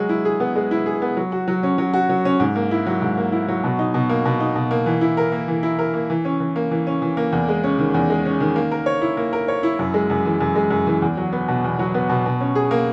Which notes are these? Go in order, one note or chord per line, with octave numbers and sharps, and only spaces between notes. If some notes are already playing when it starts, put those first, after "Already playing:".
Already playing: F#3 G#3
E4
G#4
B3
G#3
E4
G#4
B3
F#3
F#4
F#3
C#4
F#3
F#4
F#3
C#4
G#2
A#3
E4
F#3
G#2
A#3
E4
F#3
B2
D#4
B2
A#3
B2
D#4
B2
A#3
E3
E4
A#4
A#3
E3
E4
A#4
A#3
E3
C#4
E3
A#3
E3
C#4
E3
A#3
E2
G#3
C#4
D#3
E2
G#3
C#4
D#3
A#3
A#4
C#5
E4
A#3
A#4
C#5
E4
F#2
G#3
F#2
E3
F#2
G#3
F#2
E3
E2
F#3
B3
B2
E2
F#3
B3
B2
B2
C#4
G#4
A#3